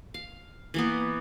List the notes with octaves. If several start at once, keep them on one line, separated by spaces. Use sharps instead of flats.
F5
E3 A#3 B3